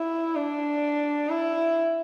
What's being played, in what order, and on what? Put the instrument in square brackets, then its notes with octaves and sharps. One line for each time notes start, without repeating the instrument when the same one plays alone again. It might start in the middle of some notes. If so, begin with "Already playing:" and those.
Already playing: [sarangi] E4
D4
E4